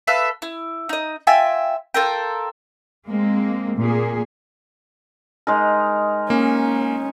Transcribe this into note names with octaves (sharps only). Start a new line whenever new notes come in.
A4 B4 E5 F5
E4
D#4 D#5
F4 E5 G5 G#5
F4 A4 A#4 G5
G#3 A#3 C4
A#2 A#3 G#4
G#3 D#4 A#4
A#3 C#4